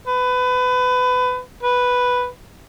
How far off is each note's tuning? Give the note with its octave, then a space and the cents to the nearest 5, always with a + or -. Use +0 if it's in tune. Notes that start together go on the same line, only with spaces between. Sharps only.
B4 +25
B4 +0